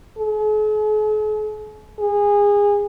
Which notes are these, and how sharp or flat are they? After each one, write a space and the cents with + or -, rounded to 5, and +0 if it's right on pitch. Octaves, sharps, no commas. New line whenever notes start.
G#4 +45
G#4 -25